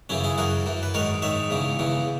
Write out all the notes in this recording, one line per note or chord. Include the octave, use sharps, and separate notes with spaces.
F#2 C#3 E3 C#4 E4
E4 G#4
F#2 E3 F#4 A#4
F#2 E3
B4
G#2 D#3 A#4 C#5
G#2 D#3 C#5 E5
E2 C#3 E3
E2 C#3 E3